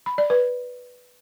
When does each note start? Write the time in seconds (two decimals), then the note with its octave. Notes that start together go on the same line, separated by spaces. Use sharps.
0.06 B5
0.18 D5
0.30 B4